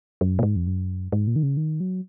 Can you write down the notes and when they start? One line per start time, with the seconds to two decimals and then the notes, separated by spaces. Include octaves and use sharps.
0.21 F#2
0.39 A#2
0.43 G#2
0.56 F2
0.67 F#2
1.12 G#2
1.27 A#2
1.36 D#3
1.43 C#3
1.57 D#3
1.80 F#3